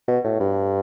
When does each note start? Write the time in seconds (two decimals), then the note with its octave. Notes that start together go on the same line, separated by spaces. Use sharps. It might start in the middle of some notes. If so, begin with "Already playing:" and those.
0.08 B2
0.24 A2
0.40 G2